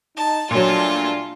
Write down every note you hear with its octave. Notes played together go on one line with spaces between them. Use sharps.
D#4 A5
A#2 F#3 G3 A3 D4 F4 A5